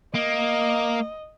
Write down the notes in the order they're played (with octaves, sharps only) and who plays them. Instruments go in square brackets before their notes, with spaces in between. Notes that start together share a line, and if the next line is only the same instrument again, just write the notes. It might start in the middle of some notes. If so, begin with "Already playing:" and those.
[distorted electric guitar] A#3 [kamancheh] D#5